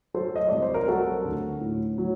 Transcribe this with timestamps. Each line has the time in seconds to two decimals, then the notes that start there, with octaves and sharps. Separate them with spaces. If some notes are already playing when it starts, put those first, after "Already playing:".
0.14 F#3 A4 C5
0.36 D#5
0.49 C2 D5
0.62 C5
0.74 A#4
0.88 F#3 F#4 A4
1.25 D2
1.61 A2
1.98 F#3